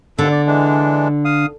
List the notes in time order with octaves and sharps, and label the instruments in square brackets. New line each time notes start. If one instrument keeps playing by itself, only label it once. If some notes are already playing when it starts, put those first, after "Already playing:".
[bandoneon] D#2 D4 A4 [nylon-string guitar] D3
[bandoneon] D5
E3 G#3 D4
F5 D#6